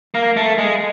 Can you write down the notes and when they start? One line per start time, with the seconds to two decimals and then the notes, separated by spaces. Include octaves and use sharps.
0.15 A#3
0.37 A3
0.58 G#3